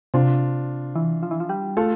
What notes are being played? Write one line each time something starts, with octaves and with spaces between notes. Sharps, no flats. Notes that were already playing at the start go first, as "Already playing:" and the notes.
C3 D4 F4
E3
F3
E3
F3
G3
A3 F4 A4